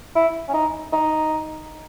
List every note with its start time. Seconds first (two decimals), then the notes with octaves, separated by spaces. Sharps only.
0.15 E4
0.48 C#4
0.54 D#4
0.92 D#4